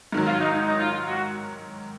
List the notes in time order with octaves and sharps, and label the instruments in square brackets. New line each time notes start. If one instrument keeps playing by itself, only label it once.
[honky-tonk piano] G#2 D#3 F#3
[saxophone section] F4
D#4
D#4
D#4
F4
F4
F#4